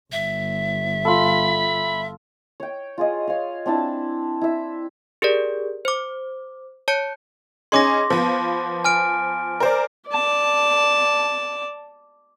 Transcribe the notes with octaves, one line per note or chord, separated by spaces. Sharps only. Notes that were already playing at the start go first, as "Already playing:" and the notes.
G1 E5
F4 A4 B5
C#5 G5
F4 G#4 D#5
C#5 F5
C4 D4 E4 A5
E4 E5
G4 G#4 A#4 D5
C5 D6
C#5 A5 G6 C#7
C#4 D#4 G#4 C6 D6 A#6
F3 B3
G#5 F6 D7
A#4 C5 D5
D5 A5